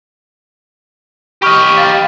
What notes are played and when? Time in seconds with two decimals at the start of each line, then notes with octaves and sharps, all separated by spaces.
1.42 G4 D#5 B5 C#6 F6
1.78 F5 A6